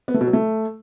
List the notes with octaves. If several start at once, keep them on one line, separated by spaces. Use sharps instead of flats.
B3
A3
B2
F#3
A3